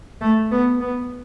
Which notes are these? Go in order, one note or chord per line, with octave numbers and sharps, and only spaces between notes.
A3
B3
B3